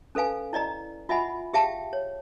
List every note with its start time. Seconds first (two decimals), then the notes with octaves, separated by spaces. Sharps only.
0.15 C#4 A4 B4 F5 G#5
0.53 E4 D5 D#5 A#5
1.09 F4 D#5 E5 F#5 G#5 B5
1.53 G4 G#4 E5 F5 G5 A5
1.93 C#5